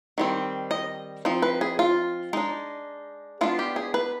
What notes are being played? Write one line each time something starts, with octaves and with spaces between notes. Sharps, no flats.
D#3 G3 C4
D#5
F3 C4 D#4
B4
G#4
F4
G#3 D4 D#4
G#3 B3 D4 F4
G4
G#4
B4